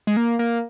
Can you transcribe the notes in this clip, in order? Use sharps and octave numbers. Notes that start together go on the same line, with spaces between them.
G#3
A#3
A#3